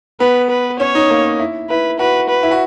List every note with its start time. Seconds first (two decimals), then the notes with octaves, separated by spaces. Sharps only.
0.20 B3 B4
0.50 B4
0.80 C#4 C#5
0.95 D#4
1.10 A#3
1.40 E4
1.70 E4 B4
1.99 F#4 B4
2.29 B4
2.43 E4
2.51 F#4